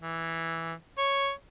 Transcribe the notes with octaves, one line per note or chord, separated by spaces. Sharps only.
E3
C#5